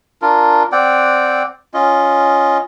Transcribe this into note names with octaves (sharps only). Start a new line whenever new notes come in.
D4 F4 A#4
C4 D5 F#5 G5
C#4 F4 D#5